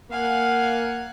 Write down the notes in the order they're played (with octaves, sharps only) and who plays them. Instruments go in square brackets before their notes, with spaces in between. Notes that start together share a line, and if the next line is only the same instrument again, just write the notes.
[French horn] A#3 [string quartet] F5 G#5 F#6 [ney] F#5